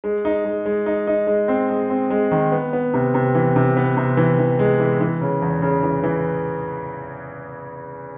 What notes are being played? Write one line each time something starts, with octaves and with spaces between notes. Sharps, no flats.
G#3
D#4
G#3
G#3
D#4
D#4
G#3
C4
G#3
C4
G#3
D#3
B3
B3
C3
C3
E3
C3
B3
C3
E3
E3
G#3
E3
E3
C#3
E2
C#3
E3
E3